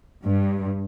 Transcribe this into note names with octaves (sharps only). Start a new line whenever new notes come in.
G2